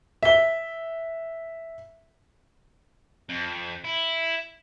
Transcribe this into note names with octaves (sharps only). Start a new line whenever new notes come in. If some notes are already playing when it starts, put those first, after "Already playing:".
E5 G7
F2
E4